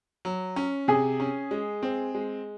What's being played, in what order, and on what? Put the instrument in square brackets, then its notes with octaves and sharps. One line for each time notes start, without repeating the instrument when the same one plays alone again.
[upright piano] F#3
C#4
[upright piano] C3 [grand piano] G#4
[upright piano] C#4
G#3
C4
G#3